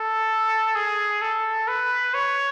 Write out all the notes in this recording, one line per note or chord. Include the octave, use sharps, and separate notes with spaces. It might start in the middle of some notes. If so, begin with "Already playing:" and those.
Already playing: A4
G#4
A4
B4
C#5